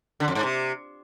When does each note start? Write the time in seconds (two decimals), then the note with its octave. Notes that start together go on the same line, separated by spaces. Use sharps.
0.20 D3
0.28 F2
0.35 G#2
0.43 C3